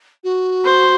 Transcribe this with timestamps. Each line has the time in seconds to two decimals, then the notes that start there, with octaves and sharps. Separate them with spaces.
0.24 F#4
0.65 C5